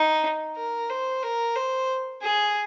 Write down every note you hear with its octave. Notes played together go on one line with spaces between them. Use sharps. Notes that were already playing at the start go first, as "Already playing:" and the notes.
Already playing: D#4
A#4
C5
A#4
C5
G#4